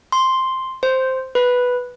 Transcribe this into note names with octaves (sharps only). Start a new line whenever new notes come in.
C6
C5
B4